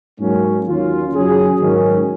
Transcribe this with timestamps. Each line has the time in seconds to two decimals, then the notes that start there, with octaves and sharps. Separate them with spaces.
0.20 G#2 F#3 A#3 C#4
0.67 D#2 D#3 F#3 C#4 F4
1.14 F#2 C#3 F#3 C#4 G#4
1.61 G#2 D#3 F#3 C#4